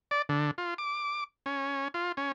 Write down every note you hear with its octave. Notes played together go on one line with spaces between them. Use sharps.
D5
D3
F4
D6
C#4
F4
C#4